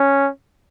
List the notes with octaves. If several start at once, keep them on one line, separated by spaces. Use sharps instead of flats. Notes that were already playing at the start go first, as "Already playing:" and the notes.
Already playing: C#4